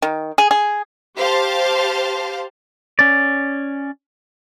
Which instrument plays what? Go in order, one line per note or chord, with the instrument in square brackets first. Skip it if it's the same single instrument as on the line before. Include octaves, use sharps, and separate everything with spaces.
[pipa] D#3
G#4
G#4
[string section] G4 C5 F5 A5
[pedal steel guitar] C#4 D5